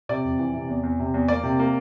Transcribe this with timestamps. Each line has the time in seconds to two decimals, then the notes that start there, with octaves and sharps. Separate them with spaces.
0.09 C3 D5
0.25 F2
0.39 E3
0.54 C3
0.69 E2
0.83 E2
1.00 C3
1.14 E2
1.28 A#3 D5
1.43 C3
1.59 A#3